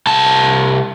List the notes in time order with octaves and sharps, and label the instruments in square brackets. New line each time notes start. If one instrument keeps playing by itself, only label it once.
[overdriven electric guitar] C2 A5